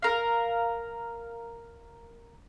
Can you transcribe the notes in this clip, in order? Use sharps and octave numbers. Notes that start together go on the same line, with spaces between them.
A#4 F5